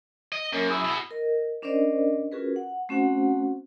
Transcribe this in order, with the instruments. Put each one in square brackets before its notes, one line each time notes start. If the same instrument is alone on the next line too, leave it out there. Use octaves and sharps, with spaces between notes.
[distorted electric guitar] D#5
[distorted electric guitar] F#2 [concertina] A#3 C#4
[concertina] E4 G#4
[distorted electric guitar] B2
[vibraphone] A#4 D#5
C#4 D4 A#4 C5 D5 D#5
C#4 F4 F#4 G#4 A#4 B4
F#5
A3 C4 C#4 F#4 C5 F#5